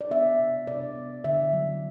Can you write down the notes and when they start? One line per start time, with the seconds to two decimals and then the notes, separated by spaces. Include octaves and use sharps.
0.01 D5
0.11 B3 E5
0.39 C3
0.67 C3 D5
0.96 B3
1.24 D3 E5
1.53 F#3